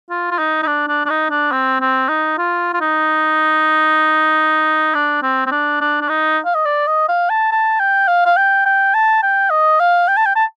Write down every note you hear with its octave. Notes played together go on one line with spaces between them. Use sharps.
F4
F4
D#4
D#4
D4
D4
D4
D#4
D4
C4
C4
D#4
F4
F4
D#4
D4
C4
C4
D4
D4
D4
D#4
F5
D#5
D5
D#5
F5
A5
A5
G5
F5
F5
G5
G5
A5
G5
D#5
F5
G5
A5
G5
A5